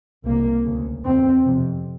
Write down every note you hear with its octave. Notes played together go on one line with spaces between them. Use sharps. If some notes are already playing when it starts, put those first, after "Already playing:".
C2 C3 A#3
D2 C#3
E2 C#3 C4
F2 C3